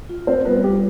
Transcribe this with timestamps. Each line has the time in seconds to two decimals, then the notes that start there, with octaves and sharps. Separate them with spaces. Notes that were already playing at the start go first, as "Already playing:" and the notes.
0.09 F4
0.27 C4 C5
0.45 G3 B3 B4
0.64 G4